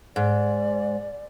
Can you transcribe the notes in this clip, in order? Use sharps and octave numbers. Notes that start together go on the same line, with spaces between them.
G#2 D5